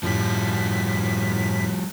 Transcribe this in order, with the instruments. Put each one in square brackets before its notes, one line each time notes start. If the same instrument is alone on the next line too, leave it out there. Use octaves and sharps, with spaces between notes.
[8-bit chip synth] F#2 A2 B6 [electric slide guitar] F3 G3